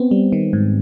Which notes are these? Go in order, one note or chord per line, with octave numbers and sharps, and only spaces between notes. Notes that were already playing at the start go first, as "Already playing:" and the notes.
Already playing: B3 C4
G3
D#3
G#2